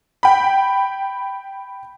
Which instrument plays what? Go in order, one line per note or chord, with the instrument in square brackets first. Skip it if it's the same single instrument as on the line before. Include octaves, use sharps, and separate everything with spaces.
[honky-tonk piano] G5 B5